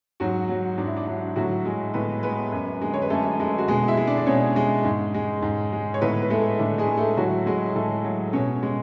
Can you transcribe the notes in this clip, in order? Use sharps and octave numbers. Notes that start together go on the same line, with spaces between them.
G#2 F#3 F#4
F#3
G#2 D4
E4
D4
F#3 D4
A2 F#3 F#4
G#3
A2 B3 B4
G#3 B3 B4
F#2
D3 G#3
C#5
B4
F#2 A3 A4
D3 G#3
F#4
B2 G#3 G#4
E4 E5
G#3
D4 D5
D5
B2 C#4 C#5
G#3
G#2
G#3
G#2
G#3
C#5
A2 B3 B4
B4
G#3 A3 A4
A2 D4
G#3 G#4
G#3
A3 A4
A2 F#3 F#4
F#3 G#3 G#4
A2 A3 A4
F#3
B2 C#4 C#5
G#3